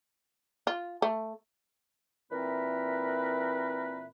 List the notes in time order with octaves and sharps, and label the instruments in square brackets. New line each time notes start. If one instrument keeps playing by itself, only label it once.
[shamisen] F4
A3
[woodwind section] A#2 E3 C4 A#4 B4 E5